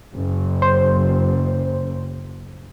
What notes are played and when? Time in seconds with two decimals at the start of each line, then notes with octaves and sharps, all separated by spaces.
0.14 F#1
0.62 C5